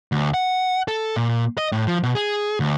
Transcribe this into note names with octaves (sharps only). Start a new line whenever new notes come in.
D2
F#5
A4
A#2
D#5
A2
F3
B2
G#4
D2